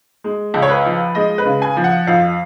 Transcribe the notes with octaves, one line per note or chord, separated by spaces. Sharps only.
G#3
C#2
C#5
B4
F3
G#3 D#5
B4
C#3
G#5
F3
F#5
F2 F5